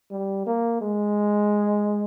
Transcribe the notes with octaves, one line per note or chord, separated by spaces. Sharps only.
G3
A#3
G#3